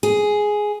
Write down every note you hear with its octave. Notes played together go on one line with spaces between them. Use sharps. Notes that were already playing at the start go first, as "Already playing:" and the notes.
G#4